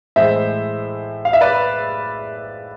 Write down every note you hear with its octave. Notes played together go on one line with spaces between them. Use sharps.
A2 E3 G#3 C5 E5
F5
E5
B4 D5